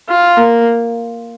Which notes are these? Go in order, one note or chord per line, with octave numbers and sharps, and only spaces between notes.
F4
A#3